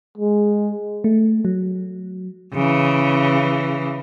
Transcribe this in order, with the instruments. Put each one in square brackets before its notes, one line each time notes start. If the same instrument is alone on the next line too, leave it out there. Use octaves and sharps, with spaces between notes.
[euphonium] G#3
[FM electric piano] A3
F#3
[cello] C#3 E3